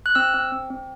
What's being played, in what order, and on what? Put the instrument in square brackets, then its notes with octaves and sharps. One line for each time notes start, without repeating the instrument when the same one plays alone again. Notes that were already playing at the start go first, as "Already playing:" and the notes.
[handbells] F#6
C4 E6
C4
C4
C4